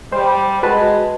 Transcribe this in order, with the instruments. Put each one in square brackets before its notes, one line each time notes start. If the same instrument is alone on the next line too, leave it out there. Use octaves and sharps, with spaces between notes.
[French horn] G3 [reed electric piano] C5
[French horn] G#3 [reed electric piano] F#4 B4 A5